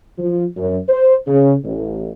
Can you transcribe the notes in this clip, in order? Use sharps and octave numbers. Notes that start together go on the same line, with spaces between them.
F3
F#2
C5
C#3
A1